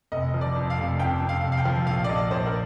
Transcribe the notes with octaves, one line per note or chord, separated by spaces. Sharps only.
F1 D#5
F3
D5
F2
F5
F1
F2 G5
F2
F5
F1
F5
G5
F3
A#1 F5
D5
A#1 D#5
A#1 C5
A#4